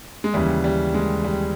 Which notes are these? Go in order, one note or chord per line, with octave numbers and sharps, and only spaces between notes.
G#3
D#2 C#3 E3 G3
G3
G#3
G3